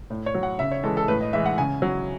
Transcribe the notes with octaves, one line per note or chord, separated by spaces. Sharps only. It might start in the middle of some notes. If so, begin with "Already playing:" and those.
A2
C#5
F#3
F#5
C#3 E5
C#5
E3 G#3 A4
A4
A2 B4
D#5
E3 G#3 E5
F#5
C#3 G#5
F#3